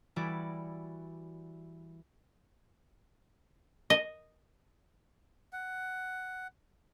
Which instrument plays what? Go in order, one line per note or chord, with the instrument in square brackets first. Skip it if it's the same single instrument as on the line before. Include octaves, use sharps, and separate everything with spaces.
[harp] E3 G3 E4 F#4 D5
[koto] D#5
[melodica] F#5